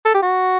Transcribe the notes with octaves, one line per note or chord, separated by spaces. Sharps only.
A4
G4
F#4